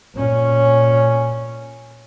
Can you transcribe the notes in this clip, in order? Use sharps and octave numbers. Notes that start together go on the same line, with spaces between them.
A#2 C#4